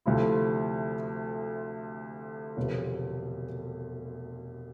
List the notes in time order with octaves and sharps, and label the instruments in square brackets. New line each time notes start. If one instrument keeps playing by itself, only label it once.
[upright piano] D2 C3 F3 A3 E4
E1 D2 C3 F3 B3